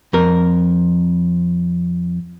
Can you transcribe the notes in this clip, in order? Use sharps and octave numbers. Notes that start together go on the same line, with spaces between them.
F2 A#4